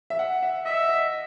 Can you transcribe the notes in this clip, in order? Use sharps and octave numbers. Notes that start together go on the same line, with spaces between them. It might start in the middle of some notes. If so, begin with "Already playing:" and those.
E5
F#5
E5
D#5 E5
D#5